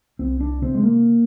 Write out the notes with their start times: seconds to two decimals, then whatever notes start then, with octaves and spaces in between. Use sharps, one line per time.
0.19 C2 C4
0.40 D4
0.62 C3 C4
0.75 G#3
0.83 A#3